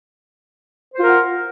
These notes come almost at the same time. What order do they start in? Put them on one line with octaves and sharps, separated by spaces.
C5 F4 A#4 F#5